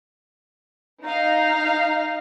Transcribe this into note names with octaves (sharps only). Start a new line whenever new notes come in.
D#4 F5